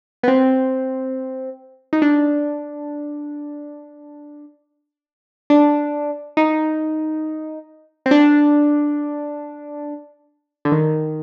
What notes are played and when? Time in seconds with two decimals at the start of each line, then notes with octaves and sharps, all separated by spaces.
0.23 B3
0.28 C4
1.93 D#4
2.02 D4
5.50 D4
6.37 D#4
8.06 C4
8.11 D4
10.65 D3
10.72 D#3